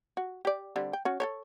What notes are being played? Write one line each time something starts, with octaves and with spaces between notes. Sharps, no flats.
F#4
G4 D5
D3 G3 C4
G5
C#4 F#4
A4 A#4 C#5